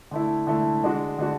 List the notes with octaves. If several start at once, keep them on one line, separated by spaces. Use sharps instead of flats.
D3 A3 E4
D3 A3 E4
D3 G#3 D4 F#4
D3 G#3 D4 F#4